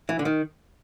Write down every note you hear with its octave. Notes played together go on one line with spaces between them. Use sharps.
E3
D3
D#3